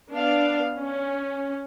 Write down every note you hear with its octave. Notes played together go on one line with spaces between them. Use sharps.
B3 D4 F5
C#4